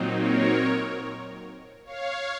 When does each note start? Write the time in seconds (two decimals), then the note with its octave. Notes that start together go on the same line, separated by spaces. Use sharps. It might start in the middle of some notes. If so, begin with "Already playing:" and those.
Already playing: A#2 F#3 C4 D#4
0.18 A#4 C#5
1.85 C#5 F5